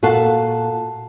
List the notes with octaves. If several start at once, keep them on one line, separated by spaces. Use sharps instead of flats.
A#2 F#4 A4 F5 F#5 A5